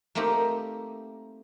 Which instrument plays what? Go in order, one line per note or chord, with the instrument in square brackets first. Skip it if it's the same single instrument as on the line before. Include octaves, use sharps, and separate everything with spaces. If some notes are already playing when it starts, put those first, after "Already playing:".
[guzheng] A3 A#3 C4 D#4 G4